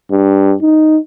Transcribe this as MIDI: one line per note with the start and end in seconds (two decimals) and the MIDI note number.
0.11 0.54 43
0.62 0.98 63